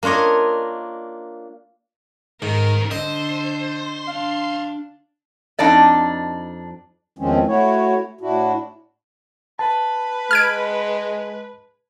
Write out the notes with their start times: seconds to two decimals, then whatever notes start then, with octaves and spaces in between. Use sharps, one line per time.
0.03 A#3 D4 F4 C#5 D#5
2.42 G#2 D#3 A#4
2.91 D3 C5 D#5
4.08 D4 F5
5.59 F2 D4 D#4 D5 D#5
7.19 E2 D#3 F3 G#3 C4 C#4
7.47 A3 E4 F#4 C#5
8.21 A2 D4 E4 F#4
9.59 B4 A5
10.31 G#3 F6 G#6 D7